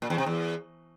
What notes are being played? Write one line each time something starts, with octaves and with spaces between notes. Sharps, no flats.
A#2
E2
C3
E2